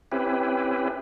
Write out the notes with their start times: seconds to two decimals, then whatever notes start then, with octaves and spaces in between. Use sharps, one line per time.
0.12 C4 C#4 E4 G4 B4